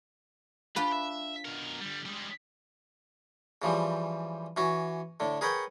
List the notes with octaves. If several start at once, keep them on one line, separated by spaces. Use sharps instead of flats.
D4 F4 G4 B4
E5
B2 A#4
D3 G3
G3 G#3
C#3 E3 F3 G3
E3 C#4 F#4
A2 D3
G#4 A#4 B4 C#5 F#5 G5